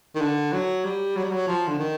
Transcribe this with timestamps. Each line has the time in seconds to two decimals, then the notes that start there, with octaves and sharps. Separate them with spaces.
0.15 D#3
0.21 D3
0.53 F#3
0.85 G3
1.16 F#3
1.24 G3
1.31 F#3
1.48 F3
1.68 D3
1.79 D#3